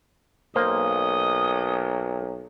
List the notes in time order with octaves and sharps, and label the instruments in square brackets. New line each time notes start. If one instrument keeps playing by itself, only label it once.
[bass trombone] B1 [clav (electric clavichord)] A#3 C5 A#5 [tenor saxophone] D#5